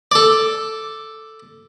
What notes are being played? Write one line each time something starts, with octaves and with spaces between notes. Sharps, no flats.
A4 D5